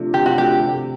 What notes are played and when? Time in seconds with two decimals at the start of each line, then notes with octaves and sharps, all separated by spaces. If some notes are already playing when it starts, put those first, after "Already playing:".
Already playing: C3 F3 A3 D4
0.13 C3 G4
0.26 F#4
0.37 F3 A3 D4 G4
0.60 C3